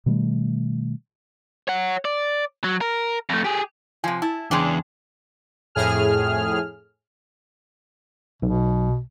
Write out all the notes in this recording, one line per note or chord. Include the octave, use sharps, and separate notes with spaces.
B2 D#3 G3 A3
C#5 F#5
D5
F#3
A#4
F2 A3
G4 G#4
C3 F3 G#5
E4 A5
E2 C#3 G#3 D4 G5 G#5 C6
F2 A2 G#4 F6
B1 B2